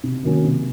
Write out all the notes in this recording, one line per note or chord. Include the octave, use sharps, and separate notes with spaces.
C3
D#3 F#3 A#3 C#4
C3